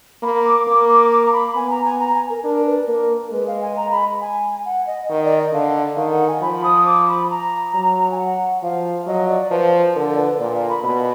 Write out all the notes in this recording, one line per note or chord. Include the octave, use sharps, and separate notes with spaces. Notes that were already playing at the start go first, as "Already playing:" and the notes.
A#3 B5
D6
A#3 D6
D6
D6
A#5
B5
B3 G#5
A#5
G#5
A#5
G#5
A#4
D4 A#4
B4
A#3 A#4
G#3 B4
F5
G#5
A#5
B5
G#5
F#5
D#5
D#3 D#5
D5
D#5
D3 F5
D#3 F5
F#5
G#5
F3 B5
D#6
D6
B5
A#5
F#3
G#5
F#5
F3 F5
F#3 D#5
D5
F3 B4
D3 A#4
D5
B4
A#2 D5
F5
B5
B2 B5